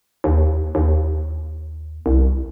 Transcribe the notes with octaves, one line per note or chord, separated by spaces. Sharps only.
D#2
D#2
C2